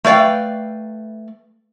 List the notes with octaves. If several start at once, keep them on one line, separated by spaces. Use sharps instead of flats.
A3 B4 D5 F5 G5